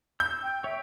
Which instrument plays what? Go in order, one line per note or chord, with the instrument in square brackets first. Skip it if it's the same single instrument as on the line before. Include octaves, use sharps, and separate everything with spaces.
[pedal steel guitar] E6 [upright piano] G6
[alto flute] G5
[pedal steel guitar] C#5 G5 [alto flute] E5